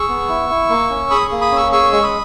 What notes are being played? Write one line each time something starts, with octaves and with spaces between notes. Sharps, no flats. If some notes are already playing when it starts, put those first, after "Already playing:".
Already playing: G#4 C#6 E6
B3
E4
E4
A#3
C#4
G#4 B5 D#6
A#3
B5 D#6
C#4
C#6 E6
G#4 C#6 E6
G#3 C#6
B5 D#6